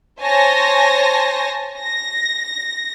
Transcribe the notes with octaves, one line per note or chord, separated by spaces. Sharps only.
C5 C#5 G#5 A5 A#6
A#6